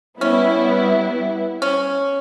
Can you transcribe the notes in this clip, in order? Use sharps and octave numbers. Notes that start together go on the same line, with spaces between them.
G3 B3 C#4 E4
C#4